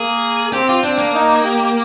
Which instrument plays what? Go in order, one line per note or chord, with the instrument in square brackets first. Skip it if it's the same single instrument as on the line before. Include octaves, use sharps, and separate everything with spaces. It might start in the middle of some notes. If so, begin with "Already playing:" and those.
Already playing: [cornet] A#3 [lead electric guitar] G#4
[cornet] C4 [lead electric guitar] G4
[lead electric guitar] F4
[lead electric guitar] C4 [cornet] D4
[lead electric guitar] A#3
[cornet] D#4
G4